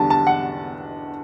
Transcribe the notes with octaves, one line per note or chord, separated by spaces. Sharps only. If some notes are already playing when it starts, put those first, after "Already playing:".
Already playing: E2 D3 G3 A5
A5
F#5